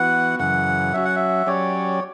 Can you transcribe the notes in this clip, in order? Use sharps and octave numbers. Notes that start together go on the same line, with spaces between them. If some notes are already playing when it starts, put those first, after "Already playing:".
Already playing: E3 B3 F#4 F#5
F#2 C#3 E3 F#5
F#3 C#4 F#4 E5
F#5
E5
F#3 C#4 G4 C#5 D5